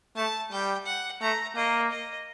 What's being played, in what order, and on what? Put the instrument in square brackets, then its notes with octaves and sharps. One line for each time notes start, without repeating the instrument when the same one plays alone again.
[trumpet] A3 [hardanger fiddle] A5
[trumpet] G3 [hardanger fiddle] G5
[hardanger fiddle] F#5
[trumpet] A3 [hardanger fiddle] A#5
[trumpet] A#3 [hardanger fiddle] D#5
[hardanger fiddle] D#5